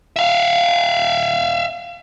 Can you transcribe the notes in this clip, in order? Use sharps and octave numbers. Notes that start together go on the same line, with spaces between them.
E5 F5